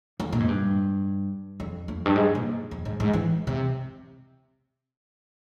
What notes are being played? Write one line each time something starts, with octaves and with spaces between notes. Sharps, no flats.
F2
A#2
G#2
G2
F2
F2
G2
G#2
A#2
F2
G#2
G#2
E3
C3